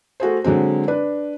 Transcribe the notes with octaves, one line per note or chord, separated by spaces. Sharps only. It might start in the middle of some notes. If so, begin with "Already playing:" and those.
A3 F#4 G#4 C5
D3 F#3 G#3 C4
D4 B4